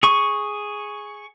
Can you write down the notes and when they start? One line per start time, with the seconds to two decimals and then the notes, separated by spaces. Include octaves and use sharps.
0.03 G#4 C#6